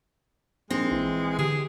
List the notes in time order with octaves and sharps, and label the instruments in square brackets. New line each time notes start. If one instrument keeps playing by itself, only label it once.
[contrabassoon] A#1 [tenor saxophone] G#3 [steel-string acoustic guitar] C4 [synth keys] D#4
[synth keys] A#1 [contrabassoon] E3
[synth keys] D3 [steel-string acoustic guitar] G4 [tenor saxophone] G#4